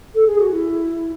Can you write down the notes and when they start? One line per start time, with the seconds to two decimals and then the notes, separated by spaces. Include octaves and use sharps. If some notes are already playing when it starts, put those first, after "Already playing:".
0.14 A4
0.26 G#4
0.38 F#4
0.50 E4